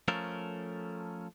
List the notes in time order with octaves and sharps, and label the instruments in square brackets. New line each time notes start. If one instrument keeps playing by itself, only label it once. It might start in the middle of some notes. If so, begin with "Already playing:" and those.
[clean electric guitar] F3 A3 C#4 A4 A#4